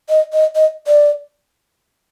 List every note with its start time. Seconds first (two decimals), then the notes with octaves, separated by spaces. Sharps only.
0.09 D#5
0.33 D#5
0.55 D#5
0.87 D5